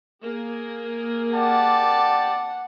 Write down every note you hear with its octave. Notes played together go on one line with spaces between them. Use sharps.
A#3 G#4 A#4
G4 D5 F#5 A5